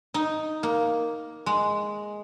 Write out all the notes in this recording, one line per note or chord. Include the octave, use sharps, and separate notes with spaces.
D#4
A#3
G#3